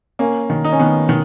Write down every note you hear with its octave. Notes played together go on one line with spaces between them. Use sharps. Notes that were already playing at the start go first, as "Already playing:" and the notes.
A#3 C#4
D#3
D#4
C#4
D#3 B3
D#3